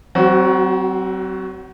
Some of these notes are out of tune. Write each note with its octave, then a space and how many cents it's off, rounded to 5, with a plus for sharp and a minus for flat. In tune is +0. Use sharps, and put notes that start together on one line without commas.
F#3 +40 C4 +0 F#4 +0